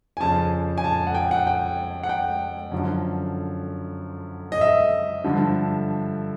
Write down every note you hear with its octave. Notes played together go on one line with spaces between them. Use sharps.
G#5
F2 C#3 F3 A5
G#5
A5
F#5
G5
F#5
G5
F#5
G5
F#2 D3 F3
D#5
E5
G2 D3 F3